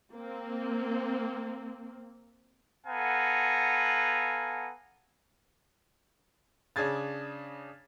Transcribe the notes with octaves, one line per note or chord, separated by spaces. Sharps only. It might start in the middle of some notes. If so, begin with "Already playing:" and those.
A#3 C4
B3 A4 F5 F#5 G#5 A#5
C#3 D4 G#4 G#6 A6